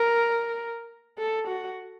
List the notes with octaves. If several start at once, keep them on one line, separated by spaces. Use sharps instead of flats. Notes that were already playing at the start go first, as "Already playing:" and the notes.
Already playing: A#4
A4
F#4